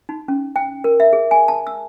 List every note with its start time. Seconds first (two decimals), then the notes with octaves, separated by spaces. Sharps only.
0.09 D#4
0.28 C#4
0.56 G5
0.84 A#4
1.00 E5
1.13 G#4
1.31 G#5
1.48 A5
1.67 E6